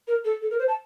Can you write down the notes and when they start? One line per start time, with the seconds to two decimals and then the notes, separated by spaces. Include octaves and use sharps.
0.07 A#4
0.24 A4
0.41 A4
0.50 A#4
0.59 C5
0.68 A5